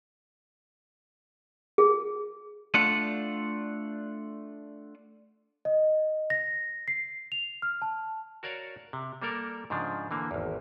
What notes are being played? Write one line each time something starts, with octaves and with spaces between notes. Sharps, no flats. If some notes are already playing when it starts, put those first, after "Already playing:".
G#4
A3 D4 F4 F#5
D#5
A#6
C7
F7
F6
A5
F#4 A#4 C#5 D5 F5
C3
G3 A#3 A4 A#4 D5
G#2 C#3 F3 D4
D3 E3 A#3
G#1 E2